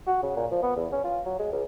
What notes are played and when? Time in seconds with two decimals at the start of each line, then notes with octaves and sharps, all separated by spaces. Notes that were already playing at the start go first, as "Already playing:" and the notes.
0.07 F#4
0.23 C#3
0.36 A#2
0.51 F3
0.63 B3
0.76 E2
0.92 C#4
1.04 F4
1.25 F#3
1.39 G#3
1.52 C#2